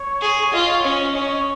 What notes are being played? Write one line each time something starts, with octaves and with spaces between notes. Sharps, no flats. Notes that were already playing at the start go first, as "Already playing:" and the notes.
Already playing: C#5
G#4
F4 D#5
C#5
C#4 D#5
C#4 C#5
D#5
C#5